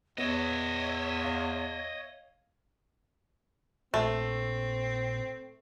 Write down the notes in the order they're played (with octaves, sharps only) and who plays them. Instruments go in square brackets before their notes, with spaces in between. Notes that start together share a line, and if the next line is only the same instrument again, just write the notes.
[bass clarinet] E2 [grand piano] B3 [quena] C#5 [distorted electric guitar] D#5 E5
[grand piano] F5
[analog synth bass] A#1 [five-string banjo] A3 [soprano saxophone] C4